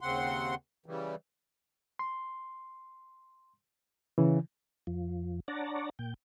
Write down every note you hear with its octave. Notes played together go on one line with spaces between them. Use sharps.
D#2 C#3 C4 F#5 C6
C#3 E3 G3
C6
C#3 E3
F2 F3
D4 C#5 D5 F#5 A5 A#5
A#2 G5